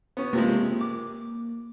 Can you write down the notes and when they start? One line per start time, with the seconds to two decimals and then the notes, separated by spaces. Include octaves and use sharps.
0.17 B3 C#4
0.33 C3 F3 G#3 A#3
0.81 D6